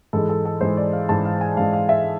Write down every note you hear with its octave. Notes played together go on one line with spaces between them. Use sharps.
G#2 E3 G#3 A4
A4
A4
G#2 E3 G#3 C5
D5
F5
G#2 E3 G#3 A5
F5
G#5
G#2 E3 G#3 F5
F5
E5